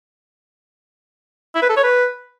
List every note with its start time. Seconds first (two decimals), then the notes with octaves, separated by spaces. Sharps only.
1.55 E4
1.62 B4
1.69 A4
1.76 C#5
1.84 B4